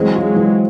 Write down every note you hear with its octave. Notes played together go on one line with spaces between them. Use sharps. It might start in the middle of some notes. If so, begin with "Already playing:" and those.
Already playing: E3 F#3 G#3 C4
F4
E3